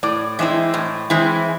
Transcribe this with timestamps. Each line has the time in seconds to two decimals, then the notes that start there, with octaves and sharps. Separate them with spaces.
0.03 A2 D5
0.39 E3 G#3 C4 E4 D#5
0.74 A2
1.10 E3 G#3 C4 E4